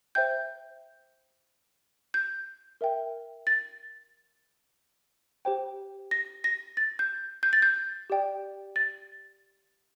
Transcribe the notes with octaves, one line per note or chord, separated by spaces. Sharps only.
C5 E5 G5 G6
G6
A#4 E5 G5
A6
G4 C5 G5
A#6
A#6
A6
G6
G6
A6
G6
G4 D5 G5
A6